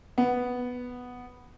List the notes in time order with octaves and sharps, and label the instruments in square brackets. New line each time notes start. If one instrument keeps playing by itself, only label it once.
[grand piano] B3